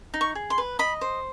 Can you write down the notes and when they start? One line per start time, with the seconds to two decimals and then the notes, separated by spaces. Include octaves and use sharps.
0.14 D#4
0.21 C#6
0.35 G#4
0.50 C6
0.58 B4
0.79 D#5 B5
1.01 C5